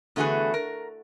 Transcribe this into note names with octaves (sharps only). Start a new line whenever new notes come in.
E2 D3 A3 F#4 G#4 B4
A#4